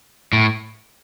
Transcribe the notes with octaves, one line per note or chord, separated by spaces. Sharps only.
A2